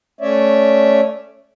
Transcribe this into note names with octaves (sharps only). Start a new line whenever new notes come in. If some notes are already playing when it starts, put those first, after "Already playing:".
A3 C#4 C#5 D5 E5